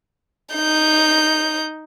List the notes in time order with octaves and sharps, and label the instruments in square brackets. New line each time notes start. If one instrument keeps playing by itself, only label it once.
[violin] D#4 G6